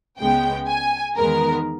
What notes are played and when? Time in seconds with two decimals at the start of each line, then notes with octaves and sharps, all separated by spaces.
0.19 C#2 C#3 G#3 B3 G5
0.68 G#5
1.16 E2 D#3 G#3 B3 A#4